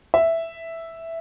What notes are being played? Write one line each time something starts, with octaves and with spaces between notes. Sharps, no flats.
E5